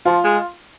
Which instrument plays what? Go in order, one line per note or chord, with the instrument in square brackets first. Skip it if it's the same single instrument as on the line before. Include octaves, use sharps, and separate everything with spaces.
[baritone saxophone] F3 [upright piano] F4
[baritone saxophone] G#3